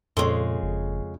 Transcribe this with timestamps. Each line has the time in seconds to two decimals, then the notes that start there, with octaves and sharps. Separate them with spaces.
0.17 F2 A#2 C#3 G#3 A4 C6
0.62 F#1